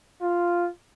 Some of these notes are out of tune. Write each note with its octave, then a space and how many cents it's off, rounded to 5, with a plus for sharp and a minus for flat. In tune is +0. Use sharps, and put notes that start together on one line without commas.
F4 -5